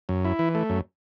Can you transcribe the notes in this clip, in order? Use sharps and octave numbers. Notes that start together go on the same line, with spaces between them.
F#2
E4
E3
A3
F#2